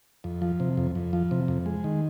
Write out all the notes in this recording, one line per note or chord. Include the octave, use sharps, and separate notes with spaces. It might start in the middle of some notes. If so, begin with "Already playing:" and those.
F2
F3
C3
F2
F2
F3
C3
F2
G#3
D#3